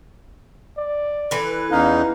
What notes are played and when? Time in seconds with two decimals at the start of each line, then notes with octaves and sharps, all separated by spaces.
0.78 D5
1.31 E3 A4 B4
1.71 E2 C#4 D#4 F5